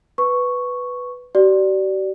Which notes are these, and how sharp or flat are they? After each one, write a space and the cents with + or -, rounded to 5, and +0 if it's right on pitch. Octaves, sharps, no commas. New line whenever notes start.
B4 +5 C#6 +0
G4 -45 D5 +0